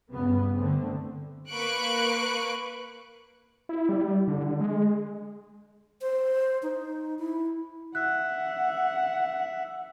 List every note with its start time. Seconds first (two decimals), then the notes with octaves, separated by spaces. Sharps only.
0.13 G2 C#3 B3
0.57 D3 A3 C4
1.50 A#3 B4 C#6 F#6 D7
3.69 E4
3.89 G3
4.28 D3
4.60 G#3
6.01 C5
6.63 D#4
7.19 E4
7.95 E5 F#5 F#6